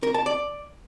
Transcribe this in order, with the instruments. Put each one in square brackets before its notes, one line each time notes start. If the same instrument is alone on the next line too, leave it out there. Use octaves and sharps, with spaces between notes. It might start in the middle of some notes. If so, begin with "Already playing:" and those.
[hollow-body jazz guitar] A#4
A5
D5